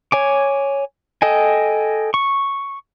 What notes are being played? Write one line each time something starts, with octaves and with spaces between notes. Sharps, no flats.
C#5 G#5 D6
A4 D#5 G5 G#5
C#6